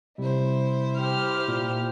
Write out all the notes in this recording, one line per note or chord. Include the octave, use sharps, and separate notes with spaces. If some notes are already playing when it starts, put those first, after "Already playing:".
C3 G3 E4 C5
G4 F6
A#2